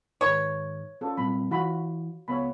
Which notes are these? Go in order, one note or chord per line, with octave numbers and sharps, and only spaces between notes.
G#2 D#3 B4 C#5
C#4 F4 A4 B4
A#2 G3 C4 B5
E3 F4 F#4 B5
C#2 B3 C#5 F5 B5